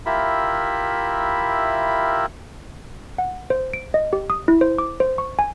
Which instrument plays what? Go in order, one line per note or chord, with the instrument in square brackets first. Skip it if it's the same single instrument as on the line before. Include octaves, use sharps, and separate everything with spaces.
[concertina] E4 F4 G4 A#4 E5 B5
[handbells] F#5
C5
D7
D#5
G4
D#6
E4
C5
D6
C5
C#6
G#5